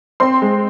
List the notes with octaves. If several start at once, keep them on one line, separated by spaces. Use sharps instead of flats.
C4 C6
G#3